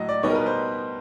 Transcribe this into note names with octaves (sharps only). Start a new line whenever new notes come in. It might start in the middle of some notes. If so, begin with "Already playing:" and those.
Already playing: A2 F#3 D#5
D5
B2 G3 B3 D#4 C#5
A#4
B4
C5